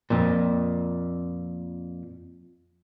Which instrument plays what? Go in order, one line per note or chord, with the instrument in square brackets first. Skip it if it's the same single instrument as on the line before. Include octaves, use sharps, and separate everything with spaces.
[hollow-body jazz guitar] F2 A#2